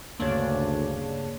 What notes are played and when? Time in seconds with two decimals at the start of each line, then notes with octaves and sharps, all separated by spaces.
0.19 D2 G2 C#3 A#3 D4 C#5